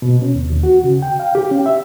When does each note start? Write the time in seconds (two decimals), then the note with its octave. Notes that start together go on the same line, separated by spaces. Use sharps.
0.02 B2
0.22 C#4
0.35 D#2
0.50 D#2
0.63 F#4
0.84 C#3
1.02 G5
1.20 F5
1.35 G4
1.51 C#4
1.66 E5